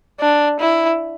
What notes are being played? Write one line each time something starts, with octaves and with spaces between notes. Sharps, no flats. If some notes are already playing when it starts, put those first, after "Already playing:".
D4
E4